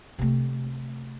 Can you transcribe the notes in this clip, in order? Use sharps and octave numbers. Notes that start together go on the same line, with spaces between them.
C3 A3